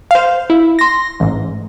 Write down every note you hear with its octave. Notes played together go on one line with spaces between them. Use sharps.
C5 F5
E4
C6 A#6
A1 G#2